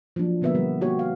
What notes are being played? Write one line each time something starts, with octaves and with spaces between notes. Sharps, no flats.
F3 F#3 A#3 D4
B2 D3 A#3 B3 A#4 E5
G3
A#3 F#4 G4 C#5
F5